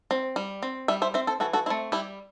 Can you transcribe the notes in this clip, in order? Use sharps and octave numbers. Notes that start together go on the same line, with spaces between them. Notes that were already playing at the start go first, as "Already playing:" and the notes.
C4
G3
C4
G3 E5 G5
C5 E5
C4 C5 E5
A4 C5
E3 F#4 A4
F#4 A4
A3 C4 E4
G3 E4 G4